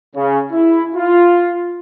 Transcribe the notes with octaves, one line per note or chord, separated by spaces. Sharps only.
C#3
E4
F4